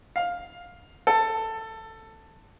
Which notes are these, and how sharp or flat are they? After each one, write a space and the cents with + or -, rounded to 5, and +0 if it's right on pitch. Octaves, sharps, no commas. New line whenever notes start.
F5 +10
A4 +15